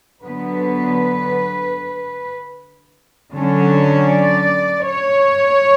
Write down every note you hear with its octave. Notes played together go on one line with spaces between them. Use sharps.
D3 F#3 B3 B4
D3 F#3 C#4
D5
C#5